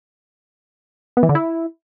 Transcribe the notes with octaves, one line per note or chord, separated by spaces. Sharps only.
B3
E3
D3
E4